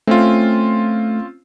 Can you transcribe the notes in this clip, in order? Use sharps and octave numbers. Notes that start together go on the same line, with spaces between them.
A3 C4 C#4 F4